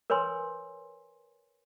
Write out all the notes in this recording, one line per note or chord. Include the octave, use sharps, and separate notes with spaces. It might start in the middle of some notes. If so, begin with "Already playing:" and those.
A#4 B4 C#5 G#5 C6